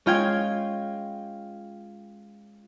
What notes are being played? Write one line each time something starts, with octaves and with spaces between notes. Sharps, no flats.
G#3 C#4 F4 F5 G5 G#6